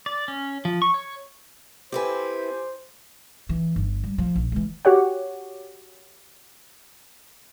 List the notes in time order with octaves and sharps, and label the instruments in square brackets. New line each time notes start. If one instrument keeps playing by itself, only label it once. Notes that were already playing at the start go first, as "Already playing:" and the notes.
[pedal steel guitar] D5
C#4
F3
C#6
C#5
[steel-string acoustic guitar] C4 E4 B4 [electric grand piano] G4 A4 G#5 [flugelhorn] C5
[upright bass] E3
G1
G3
F3
A#1
E3 G#3
[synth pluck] F#4 G4 C#5 F#5